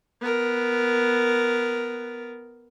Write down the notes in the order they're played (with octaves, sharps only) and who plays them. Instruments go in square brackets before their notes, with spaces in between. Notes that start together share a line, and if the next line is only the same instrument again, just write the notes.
[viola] B3 A#4